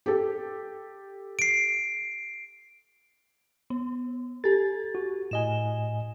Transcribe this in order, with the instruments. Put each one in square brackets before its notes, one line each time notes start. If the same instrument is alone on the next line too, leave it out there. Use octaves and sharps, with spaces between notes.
[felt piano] G4 A4
[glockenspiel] C7 D7
[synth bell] B3
[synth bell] G4 A4 [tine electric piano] A6
[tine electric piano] F#4
[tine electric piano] A2 D#5 G#5 [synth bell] E7 G7